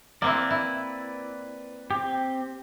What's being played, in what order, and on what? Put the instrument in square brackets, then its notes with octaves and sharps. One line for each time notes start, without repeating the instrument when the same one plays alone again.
[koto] A#3 C4 E4 [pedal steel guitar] B4 D5
[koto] E4
[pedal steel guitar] C4 G4